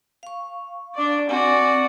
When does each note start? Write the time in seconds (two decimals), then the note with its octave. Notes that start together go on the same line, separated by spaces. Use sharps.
0.23 F5 C#6
0.94 D4 D5
1.29 C4 F#4 D5 G#5